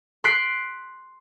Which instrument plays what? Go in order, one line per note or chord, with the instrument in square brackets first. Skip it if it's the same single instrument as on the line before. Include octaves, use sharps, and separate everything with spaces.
[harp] C6 F#6 B6 C7 D7